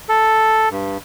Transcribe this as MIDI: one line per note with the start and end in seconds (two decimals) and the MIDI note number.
0.09 0.69 69
0.71 0.97 43